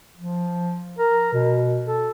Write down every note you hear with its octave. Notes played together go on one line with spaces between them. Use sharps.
F3
A#4
B2
A4